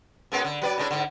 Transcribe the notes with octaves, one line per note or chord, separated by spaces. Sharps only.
F#2 G#3 B3
D3
F#3 B4 D5
A2 G#3 D4
G#2 D3